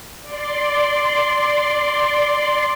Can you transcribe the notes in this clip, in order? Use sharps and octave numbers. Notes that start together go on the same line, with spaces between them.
D5 C6